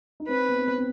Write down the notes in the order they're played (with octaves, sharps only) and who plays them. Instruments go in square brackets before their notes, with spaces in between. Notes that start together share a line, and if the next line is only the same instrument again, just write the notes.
[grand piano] D#4
[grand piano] C4 [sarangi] B4
[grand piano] B3
C4
B3
C4